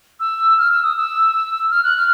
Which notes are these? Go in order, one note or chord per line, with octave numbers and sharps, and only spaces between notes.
E6
F6
E6
D#6
E6
F6
F#6
F6